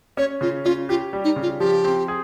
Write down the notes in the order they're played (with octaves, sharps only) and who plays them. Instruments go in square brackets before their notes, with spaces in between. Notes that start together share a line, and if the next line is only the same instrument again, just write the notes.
[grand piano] C#4 [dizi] C#5
[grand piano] C#3 [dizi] F4
[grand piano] C#4 [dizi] F4
[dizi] F4 [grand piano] G4
[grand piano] G3
[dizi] D#4
[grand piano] C#3
[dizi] F4
[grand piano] F3 [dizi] G4
[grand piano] C4
G#4